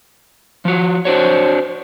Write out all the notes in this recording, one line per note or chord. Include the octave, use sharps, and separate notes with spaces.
F3 F#4
D4 F#4 C5 C#5